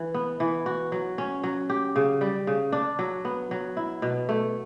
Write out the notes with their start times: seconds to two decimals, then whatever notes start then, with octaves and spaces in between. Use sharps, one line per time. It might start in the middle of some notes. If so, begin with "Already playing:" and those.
Already playing: E3
0.14 B3
0.40 E3
0.66 F#4
0.92 F#3
1.18 C#4
1.44 F#3
1.69 G4
1.96 C#3
2.21 G3
2.47 C#3
2.72 D4
2.99 F#3
3.25 B3
3.51 F#3
3.77 E4
4.02 B2
4.29 A3